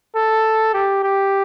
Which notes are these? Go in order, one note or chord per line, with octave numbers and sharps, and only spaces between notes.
A4
G4
G4